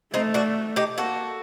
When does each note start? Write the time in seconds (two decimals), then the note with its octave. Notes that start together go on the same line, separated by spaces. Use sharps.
0.13 A3 C4 D#4
0.34 D4 F#4
0.76 D#4 G4
0.98 A#3 F#4 A4